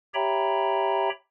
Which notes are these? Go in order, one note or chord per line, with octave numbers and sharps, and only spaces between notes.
G4 C#5 E5 G5 A#5 B5